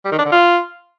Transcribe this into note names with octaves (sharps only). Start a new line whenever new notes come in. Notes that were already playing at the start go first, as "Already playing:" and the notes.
G3
D#3
D4
D3
F4